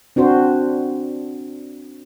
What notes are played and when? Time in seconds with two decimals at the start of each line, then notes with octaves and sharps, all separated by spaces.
0.16 C4 D4 F#4 C5